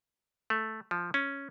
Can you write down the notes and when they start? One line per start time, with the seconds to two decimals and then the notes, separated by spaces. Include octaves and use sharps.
0.50 A3
0.91 F3
1.14 C#4